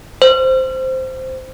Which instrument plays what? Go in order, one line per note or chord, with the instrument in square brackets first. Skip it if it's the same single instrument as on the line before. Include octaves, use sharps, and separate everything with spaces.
[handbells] C5